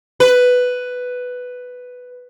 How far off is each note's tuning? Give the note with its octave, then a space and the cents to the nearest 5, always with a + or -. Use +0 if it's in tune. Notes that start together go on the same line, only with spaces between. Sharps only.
B4 +5